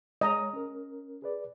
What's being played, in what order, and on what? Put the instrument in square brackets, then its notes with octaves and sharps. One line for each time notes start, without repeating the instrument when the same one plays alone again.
[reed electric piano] G#3 C#5 [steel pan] D#5 A#5
[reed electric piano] C#4 A#4
G#4 B4 D5